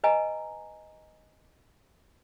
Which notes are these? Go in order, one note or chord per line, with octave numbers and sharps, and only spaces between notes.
B4 D#5 G#5 A#5